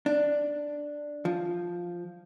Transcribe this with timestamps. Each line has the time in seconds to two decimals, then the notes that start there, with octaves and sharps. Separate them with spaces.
0.06 D4
1.25 F3